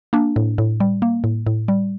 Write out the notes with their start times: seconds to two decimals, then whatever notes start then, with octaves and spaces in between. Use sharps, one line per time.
0.13 A#3 D4
0.36 A2
0.58 A2
0.80 G3
1.02 A#3
1.24 A2
1.47 A2
1.68 G3